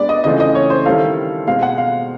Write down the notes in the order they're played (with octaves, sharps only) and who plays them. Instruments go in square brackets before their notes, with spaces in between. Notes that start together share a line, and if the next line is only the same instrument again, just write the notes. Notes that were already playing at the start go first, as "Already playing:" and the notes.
Already playing: [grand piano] G#3 B3 D4 G4 B4 [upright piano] D5
[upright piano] D#5
[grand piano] C#3 E3 A3 C4 F4 [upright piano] D#5
[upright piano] D#5
C#5
C5
[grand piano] D#3 G3 C4 E4 A4 [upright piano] F5
[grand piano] B2 G#3 C4 [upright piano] F5
[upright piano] F#5
F5